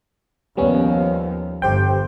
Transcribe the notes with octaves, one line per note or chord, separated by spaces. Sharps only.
D#2 F3 G3 B3 C#4
G1 G4 C5 G5